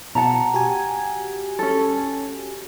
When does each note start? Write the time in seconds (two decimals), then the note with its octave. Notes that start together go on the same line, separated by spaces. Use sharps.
0.15 B2 F#5 A5 A#5
0.54 F#4 G4 G#5
1.59 C#4 A4